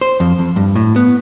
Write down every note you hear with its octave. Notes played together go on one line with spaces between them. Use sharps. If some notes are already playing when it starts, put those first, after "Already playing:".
C5
F2
F2
G2
A2
B3